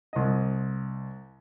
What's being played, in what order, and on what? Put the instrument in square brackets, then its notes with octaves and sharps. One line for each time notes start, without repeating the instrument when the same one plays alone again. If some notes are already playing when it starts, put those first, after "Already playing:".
[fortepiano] C2 D#5